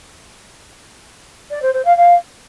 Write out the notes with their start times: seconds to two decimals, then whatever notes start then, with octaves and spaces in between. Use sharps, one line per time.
1.50 D5
1.62 C5
1.73 C5
1.85 F5
1.97 F5